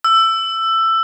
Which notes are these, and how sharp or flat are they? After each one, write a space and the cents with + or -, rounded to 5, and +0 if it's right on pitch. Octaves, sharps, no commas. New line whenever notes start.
E6 +15